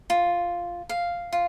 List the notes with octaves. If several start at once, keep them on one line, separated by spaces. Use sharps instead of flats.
F4
F5
F4